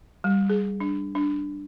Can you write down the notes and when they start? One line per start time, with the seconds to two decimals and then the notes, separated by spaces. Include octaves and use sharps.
0.24 G3
0.50 G#4
0.80 D4
1.15 D4